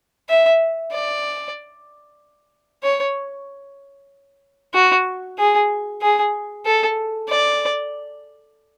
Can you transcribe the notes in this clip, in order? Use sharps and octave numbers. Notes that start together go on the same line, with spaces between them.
E5
D5
C#5
F#4
G#4
G#4
A4
D5